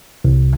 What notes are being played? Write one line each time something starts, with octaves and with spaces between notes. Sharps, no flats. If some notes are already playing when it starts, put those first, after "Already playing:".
C2